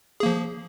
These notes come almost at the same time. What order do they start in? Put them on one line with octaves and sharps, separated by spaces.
G#4 A#3 F3